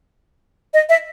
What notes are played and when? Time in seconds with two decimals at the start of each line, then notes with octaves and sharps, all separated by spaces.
0.74 D#5
0.89 E5